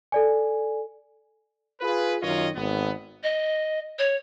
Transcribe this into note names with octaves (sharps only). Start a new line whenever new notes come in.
A4 D5 G#5
F4 G#4 B4
F#2 D#3 F4 C#5 D#5
G#1 B3
D#5
C#5